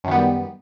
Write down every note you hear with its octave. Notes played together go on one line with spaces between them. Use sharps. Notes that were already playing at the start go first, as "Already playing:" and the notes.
F#2 D#3 G3 B3